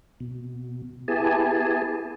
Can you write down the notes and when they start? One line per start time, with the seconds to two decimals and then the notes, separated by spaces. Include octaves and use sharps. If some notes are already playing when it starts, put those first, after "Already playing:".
0.20 B2
1.08 B3 E4 G4 G#4 G#5 A5